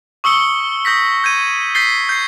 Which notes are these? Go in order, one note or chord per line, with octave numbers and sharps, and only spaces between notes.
C#6 D#6 E6 C#7 G7
D#6 G6 A#6 B6
G6 G#6 D#7
G6 A6 B6 C7 G7
G6 C7